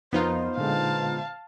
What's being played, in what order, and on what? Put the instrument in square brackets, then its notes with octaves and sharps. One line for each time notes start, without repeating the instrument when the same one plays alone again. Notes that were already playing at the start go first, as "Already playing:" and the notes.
[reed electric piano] F2 F3 A#4 [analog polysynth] B3 D#4 F4 [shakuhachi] C5
[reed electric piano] A#2 D3 G#3 [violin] F5 A5